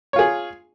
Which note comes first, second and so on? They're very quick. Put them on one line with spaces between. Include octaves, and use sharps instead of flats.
C#5 F4 G#4